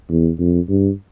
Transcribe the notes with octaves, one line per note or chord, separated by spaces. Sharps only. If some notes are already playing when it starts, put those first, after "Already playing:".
E2
F2
G2